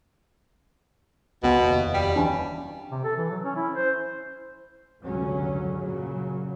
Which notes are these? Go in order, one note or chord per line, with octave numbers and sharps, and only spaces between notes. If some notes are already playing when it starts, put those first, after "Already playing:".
C#2 B2 B3
F1 D#2
G3
E3 C#4 D4
C3
A4
E3
F#3
C#4
E4
C5
F1 C#2 G2 D3 F#3 C#4
F#2 A#2 C#3 F#3